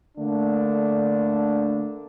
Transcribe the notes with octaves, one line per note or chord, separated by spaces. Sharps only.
D3 A3 A#3 D4